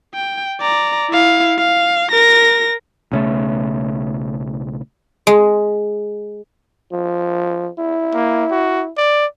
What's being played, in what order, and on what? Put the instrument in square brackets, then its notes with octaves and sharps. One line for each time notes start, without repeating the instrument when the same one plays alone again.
[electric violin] G5
D5 A#5
E4 F5
F5
A#4 A#6
[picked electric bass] B1 C#3 A3
[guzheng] G#3
[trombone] F3
E4
[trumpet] A#3
F#4
D5